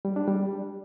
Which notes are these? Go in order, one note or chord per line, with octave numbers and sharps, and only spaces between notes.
G3
D4
G3